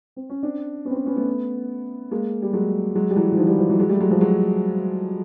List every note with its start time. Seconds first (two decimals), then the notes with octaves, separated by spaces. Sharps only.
0.16 C4
0.30 C#4
0.43 C4 D4
0.85 B3 C#4
0.91 C4
0.95 B3 C#4
1.06 B3 C#4
1.16 A3 B3
2.11 G#3 A#3
2.42 G3
2.53 F#3 G#3
2.96 F#3 G#3
3.11 G3
3.16 E3 F#3
3.32 E3
3.37 D#3 F3
3.47 F3 G3
3.58 F3 G3
3.69 E3 F#3
3.79 F#3 G#3
3.89 G3 A3
4.00 F#3 G#3
4.11 F3 G3
4.21 F#3 G#3